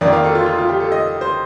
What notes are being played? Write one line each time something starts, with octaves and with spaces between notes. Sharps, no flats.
F2 D#3 A#3 D5
F5
A4
F4
F4
F4
G4
A4
D#5
C5